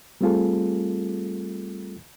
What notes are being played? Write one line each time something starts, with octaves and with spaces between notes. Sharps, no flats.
G3 A3 C4 F4 G#4 A4